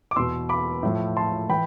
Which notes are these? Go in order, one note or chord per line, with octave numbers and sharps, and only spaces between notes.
D6
E2 B2 C6 E6
B5 D6
A2 F3
A5 C6
E3 G5 B5